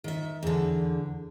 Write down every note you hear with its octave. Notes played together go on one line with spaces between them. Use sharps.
D#3 E5
E2 D3